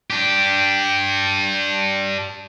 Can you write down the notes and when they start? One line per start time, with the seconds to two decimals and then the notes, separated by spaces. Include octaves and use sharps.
0.10 D4 G4